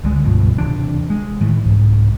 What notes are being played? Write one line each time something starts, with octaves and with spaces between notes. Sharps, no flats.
C#2 D3 G#3
C#2 G2 B2 F3
D#1 C3 E3 D4
G#3
A2 D#3 E3
C2 G#2